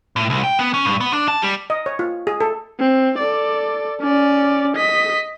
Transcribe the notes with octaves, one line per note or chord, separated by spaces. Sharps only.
A2
C2
G5
B3
C#4
G2
B3
D4
A5
G3
D#5
C#5
F4
G#4
A4
C4
A4 D5
C#4 D5
D#5 B6